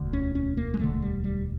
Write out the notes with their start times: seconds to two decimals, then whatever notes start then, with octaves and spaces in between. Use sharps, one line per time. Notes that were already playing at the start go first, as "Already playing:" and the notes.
Already playing: E1 D2 D3
0.13 C#4
0.35 C#4
0.57 A#3
0.74 G#3
0.79 E1 D2 D3 A3
1.02 G3
1.24 G3